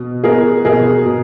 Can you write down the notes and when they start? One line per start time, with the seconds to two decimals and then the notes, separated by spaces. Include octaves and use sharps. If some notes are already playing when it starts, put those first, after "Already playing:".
Already playing: B2
0.24 B3 G#4 A#4
0.65 B2 G#4 A#4
1.06 B2